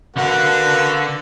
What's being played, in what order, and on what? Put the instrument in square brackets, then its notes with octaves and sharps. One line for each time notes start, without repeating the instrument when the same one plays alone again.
[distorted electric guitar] D3 F#5 [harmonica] A#3 F#4 B4